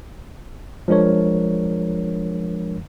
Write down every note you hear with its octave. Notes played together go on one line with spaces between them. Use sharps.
F3 G#3 D4 A#4 C#5